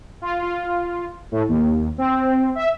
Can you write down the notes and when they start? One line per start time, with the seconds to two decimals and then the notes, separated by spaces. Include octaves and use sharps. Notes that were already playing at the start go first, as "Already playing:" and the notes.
0.22 F4
0.42 F4
1.32 A2
1.49 D#2
1.98 C4
2.55 E5